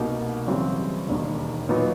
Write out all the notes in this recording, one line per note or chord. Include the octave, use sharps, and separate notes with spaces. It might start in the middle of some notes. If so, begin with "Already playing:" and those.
Already playing: C2 B2 G3 A#3 D#4
F#2 C#3 E3 G3 C4
E1 D#2 D#3
A#2 F#3 B3 D#4